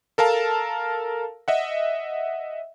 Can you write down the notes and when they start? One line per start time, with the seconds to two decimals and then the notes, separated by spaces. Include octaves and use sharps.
0.18 A4 A#4 F5 A5
1.48 D#5 E5 F#5